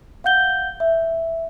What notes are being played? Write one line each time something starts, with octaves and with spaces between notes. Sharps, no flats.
F5 F#5 G6 G7
E5